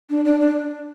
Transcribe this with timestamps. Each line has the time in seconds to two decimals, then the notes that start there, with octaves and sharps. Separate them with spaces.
0.10 D4
0.25 D4
0.40 D4